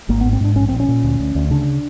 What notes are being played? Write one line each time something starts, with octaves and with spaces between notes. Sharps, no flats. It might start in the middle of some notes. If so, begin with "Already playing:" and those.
G#1 A#3
G#2 B3
C4
G#2 D4
A#1 C#4
A#2 C4
C#4
A#2
D2
D2
D2
C#3 D4